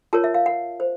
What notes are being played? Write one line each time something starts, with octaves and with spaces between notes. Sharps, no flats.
F4 A#4 C#5 A5
E5
F5
F#5
C5